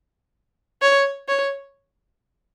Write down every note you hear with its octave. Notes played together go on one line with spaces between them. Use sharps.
C#5
C#5